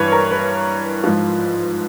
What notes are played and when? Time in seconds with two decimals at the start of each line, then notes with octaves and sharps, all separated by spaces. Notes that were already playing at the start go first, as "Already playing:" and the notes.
Already playing: G2 E3 B4 C#5
0.12 A#4
0.31 B4
1.04 G#2 F3